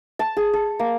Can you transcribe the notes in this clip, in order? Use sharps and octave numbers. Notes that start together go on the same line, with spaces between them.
A5
G#4
A4
A#3